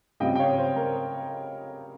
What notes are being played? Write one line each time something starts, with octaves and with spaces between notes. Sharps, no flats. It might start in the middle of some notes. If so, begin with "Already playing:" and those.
C#3 G3 C4 F4 D#5 G5
G5
C#5 F5
C5
A#4